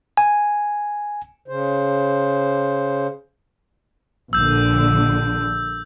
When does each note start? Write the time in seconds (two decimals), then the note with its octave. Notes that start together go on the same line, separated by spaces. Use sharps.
0.17 G#5
1.48 C#3 C5
4.33 A#1 D3 E6 G6